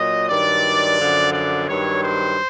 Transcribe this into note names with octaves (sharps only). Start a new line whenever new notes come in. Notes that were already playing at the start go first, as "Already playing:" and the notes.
Already playing: A#2 F#3 D#5
G2 D#3 F#3 D5
F#2 D3 F3
D5
G2 D#3 F#3 C#5
C5